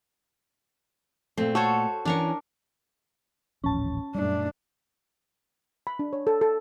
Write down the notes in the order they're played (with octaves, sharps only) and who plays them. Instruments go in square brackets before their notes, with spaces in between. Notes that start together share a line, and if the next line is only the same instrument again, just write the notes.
[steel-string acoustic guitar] A#2 A3 [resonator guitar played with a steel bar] C4
[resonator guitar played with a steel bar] F#4 [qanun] A4 C5 C#5
[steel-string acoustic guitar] E3 C#4 [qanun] D4 A#4 C#6
[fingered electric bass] D#1 A1 F3 [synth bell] C#4 A5
[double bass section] F#2 A#2 A3 [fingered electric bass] G3 [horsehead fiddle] D4
[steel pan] B5
D4
C#5
A4
A4